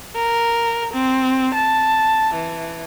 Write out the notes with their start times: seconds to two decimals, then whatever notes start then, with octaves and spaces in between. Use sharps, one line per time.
0.16 A#4
0.93 C4
1.54 A5
2.34 E3